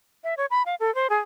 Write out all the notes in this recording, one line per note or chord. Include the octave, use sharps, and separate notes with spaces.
E5
C#5
B5
F5
A4
C5
G#4